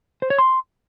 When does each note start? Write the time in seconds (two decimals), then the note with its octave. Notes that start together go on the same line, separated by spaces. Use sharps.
0.22 C5
0.30 C#5
0.38 C6